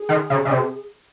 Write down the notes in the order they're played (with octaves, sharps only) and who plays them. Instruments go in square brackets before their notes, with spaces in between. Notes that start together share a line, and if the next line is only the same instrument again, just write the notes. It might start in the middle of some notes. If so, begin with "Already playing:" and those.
Already playing: [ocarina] G#4
[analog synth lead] D#3
C#3
C#3
C3